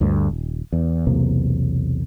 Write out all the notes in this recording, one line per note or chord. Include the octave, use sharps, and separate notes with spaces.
D2 G2
D#1
E2
B1 E2 C3 A#3